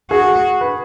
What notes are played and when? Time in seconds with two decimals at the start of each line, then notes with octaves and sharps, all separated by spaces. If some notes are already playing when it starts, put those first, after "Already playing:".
0.11 F#4 G#4
0.61 B4